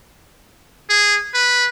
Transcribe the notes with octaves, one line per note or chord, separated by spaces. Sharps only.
G#4
B4